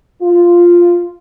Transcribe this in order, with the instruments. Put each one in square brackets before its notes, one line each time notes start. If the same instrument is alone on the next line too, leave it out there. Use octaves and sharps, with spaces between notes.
[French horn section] F4